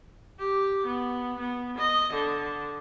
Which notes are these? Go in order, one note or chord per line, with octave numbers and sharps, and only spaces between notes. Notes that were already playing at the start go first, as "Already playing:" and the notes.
G4
B3
B3
D#5
D3